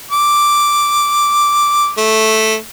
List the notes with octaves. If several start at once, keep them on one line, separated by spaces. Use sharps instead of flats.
D6
A3